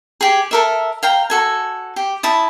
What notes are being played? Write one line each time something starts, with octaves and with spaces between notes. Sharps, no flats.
G4 G#4
A4 A#4 E5
F5 G5 A#5
F#4 A4 G#5
G4
E4 A5 D#6